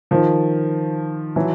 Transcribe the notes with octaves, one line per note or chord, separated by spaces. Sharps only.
D#3 F3
E3 F#3